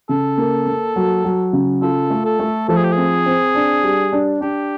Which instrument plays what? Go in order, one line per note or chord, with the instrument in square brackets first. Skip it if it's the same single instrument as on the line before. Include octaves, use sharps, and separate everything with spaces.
[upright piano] C#3 [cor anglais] A4
[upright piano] A#3
A#3
F#3
F#3
C#3
[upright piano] F4 [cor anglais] A4
[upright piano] A3
[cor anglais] A4
[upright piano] A3
[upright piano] F3 [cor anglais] A4
[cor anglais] G#4
G4
G#4
[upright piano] C4
C4
D4
G3
D4
[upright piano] D4 [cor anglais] G4